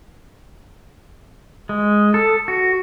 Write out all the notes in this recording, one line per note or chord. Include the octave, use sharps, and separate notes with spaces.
G#3
A4
F#4